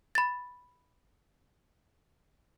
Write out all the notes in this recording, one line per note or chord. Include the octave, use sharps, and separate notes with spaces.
B5 A6